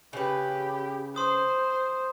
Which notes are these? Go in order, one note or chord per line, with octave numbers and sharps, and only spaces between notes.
C#3 G4 B4
C5 C6 D#6